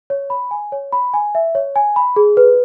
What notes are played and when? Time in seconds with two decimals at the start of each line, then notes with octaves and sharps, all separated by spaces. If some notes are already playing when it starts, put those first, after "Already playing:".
0.10 C#5
0.30 B5
0.51 G#5
0.72 C#5
0.93 B5
1.14 G#5
1.35 E5
1.55 C#5
1.76 G#5
1.96 B5
2.16 G#4
2.37 B4